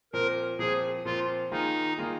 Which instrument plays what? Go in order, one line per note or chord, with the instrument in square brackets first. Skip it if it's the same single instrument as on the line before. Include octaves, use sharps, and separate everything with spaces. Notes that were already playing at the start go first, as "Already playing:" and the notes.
[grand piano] A#2 F3 C4 [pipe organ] A#4
[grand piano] A#2 F3 C4 [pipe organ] G#4
[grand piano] A#2 F3 C4 [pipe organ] F4
[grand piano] D#3 A#3 F4 G#4 [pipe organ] D#4
[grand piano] D#3 A#3 F4 G#4